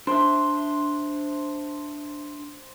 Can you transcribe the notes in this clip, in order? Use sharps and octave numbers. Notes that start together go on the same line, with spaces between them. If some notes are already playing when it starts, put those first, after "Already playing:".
D4 C5 E5